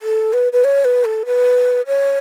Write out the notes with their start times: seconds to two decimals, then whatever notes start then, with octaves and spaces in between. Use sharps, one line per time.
0.02 A4
0.33 B4
0.52 B4
0.64 C#5
0.85 B4
1.05 A4
1.26 B4
1.87 C#5